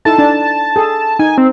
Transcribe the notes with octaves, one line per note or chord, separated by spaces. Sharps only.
D#4 E4 A4 A5
D4
G#4 A4
D#4 G#5
C4